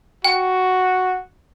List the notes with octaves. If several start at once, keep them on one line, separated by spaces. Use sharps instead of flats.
F#4 G5